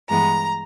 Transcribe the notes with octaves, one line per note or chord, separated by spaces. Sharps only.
G2 E3 G#3 B3 A#5